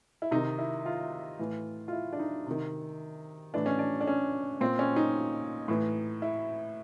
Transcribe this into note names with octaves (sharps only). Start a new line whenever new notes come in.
E4
C3 D#3 D#4
E4
F4
A2 E3
F4
E4
D4
D#4
C3 D#3
A2 E3 D4
C#4
D4
D4
C#4
A#2 C4
C#4
D#4
A2 E3
E4